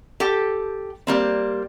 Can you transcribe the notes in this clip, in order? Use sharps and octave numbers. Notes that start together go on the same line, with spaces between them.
G4 A4 G5
G3 A#3 C4